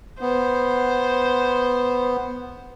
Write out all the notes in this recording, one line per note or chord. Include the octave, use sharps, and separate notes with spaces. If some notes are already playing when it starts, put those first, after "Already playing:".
B3 C5